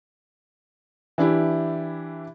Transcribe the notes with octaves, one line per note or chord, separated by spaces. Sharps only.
E3 D4 E4 G4